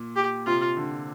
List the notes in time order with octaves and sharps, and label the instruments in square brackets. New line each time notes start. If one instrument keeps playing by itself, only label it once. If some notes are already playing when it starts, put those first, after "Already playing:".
Already playing: [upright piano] A#2
[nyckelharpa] G4
[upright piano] C3 [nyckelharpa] F4
[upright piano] D3